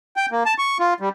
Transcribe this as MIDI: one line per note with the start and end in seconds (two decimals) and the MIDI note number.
0.16 0.26 79
0.32 0.43 58
0.46 0.53 81
0.58 0.78 85
0.80 0.94 65
1.00 1.09 55